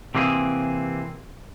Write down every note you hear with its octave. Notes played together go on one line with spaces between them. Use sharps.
C3 E3 A#3 C4 G#4